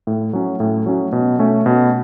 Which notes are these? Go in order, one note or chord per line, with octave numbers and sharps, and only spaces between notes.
A2
F#3 C#4
A2
F#3 C#4
B2
A3 C#4
B2